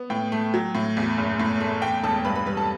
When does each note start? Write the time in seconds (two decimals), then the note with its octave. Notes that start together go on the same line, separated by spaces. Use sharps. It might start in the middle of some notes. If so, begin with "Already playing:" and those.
Already playing: B3
0.10 A2 G5
0.32 A3
0.54 F#3
0.75 A2
0.97 E2
1.17 F#1
1.40 A2
1.60 A3
1.82 E2 G5
2.03 E1 A4 A5
2.25 G2 B4 B5
2.35 B4 B5
2.46 G3 B4 B5
2.57 A4 A5